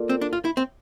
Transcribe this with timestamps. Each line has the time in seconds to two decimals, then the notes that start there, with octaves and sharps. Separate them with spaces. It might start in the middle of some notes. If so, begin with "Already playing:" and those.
Already playing: A#3 F4 A4 D5
0.09 C4
0.21 D4
0.33 F4
0.45 E4
0.57 C4